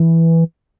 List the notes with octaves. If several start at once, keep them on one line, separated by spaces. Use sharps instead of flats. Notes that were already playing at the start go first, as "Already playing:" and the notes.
Already playing: E3